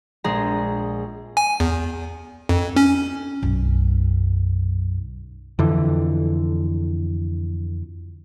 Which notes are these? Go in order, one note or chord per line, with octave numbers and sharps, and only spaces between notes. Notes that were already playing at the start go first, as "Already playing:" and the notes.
A#1 G#3 G#4 A#5
G#5
E2
F2
C#4
B1 F#2
F2 D3 E3